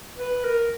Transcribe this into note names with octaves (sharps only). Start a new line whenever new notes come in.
B4
A#4